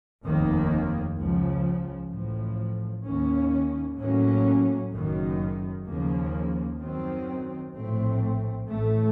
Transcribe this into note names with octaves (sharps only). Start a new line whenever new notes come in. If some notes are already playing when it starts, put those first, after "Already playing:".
F1 D#2 D#3 A#3
C#2 C#3 F3
A1 A2 F3
D#2 D#3 A#3 C#4
A2 F#3 A#3 C#4
F#1 F#2 D#3
D#2 C#3 F3 A#3
F#2 D#3 F#3 C4
A#1 A2 A3 C4
A1 A2 A3